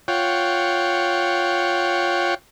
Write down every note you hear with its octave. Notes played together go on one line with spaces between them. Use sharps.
F4 C#5 F#5 G5